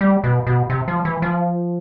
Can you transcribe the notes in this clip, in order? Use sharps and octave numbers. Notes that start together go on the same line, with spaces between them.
G3
B2
B2
C3
F3
E3
F3